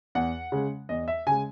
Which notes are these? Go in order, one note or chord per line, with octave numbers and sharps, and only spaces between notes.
E2 F#5
C#3 G#3
E2 D#5
E5
C#3 G#3 G#5